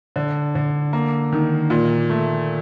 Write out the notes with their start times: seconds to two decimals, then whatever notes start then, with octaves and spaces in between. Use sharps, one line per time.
0.16 D3
0.55 D3
0.93 A#3
1.32 D#3
1.70 A#2
2.10 A3